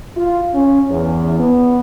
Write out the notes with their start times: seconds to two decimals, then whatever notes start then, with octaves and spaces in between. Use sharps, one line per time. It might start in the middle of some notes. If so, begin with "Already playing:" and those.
0.16 F4
0.54 C#4
0.90 E2
1.39 B3